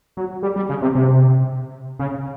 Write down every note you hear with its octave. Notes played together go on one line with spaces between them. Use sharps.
F#3
G3
G3
C#3
C3
C3
C#3